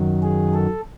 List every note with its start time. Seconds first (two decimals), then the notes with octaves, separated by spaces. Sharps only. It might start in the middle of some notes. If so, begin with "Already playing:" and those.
Already playing: F#2 D#3 F#3
0.23 G#4
0.54 A4